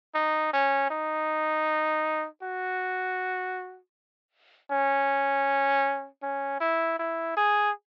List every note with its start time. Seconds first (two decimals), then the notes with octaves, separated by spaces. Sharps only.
0.15 D#4
0.53 C#4
0.90 D#4
2.43 F#4
4.72 C#4
6.22 C#4
6.60 E4
6.99 E4
7.37 G#4